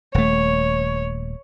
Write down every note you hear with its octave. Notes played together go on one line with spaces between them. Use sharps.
D#1 A3 C#5